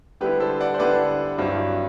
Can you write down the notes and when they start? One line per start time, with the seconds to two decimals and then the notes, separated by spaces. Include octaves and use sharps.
0.21 D3 G3 B3 E4 G4 B4
0.40 A4 C5
0.61 D5 F#5
0.74 C5
0.79 D3 G3 B3 E4 B4 D5
1.38 G2 F#3 C4 E4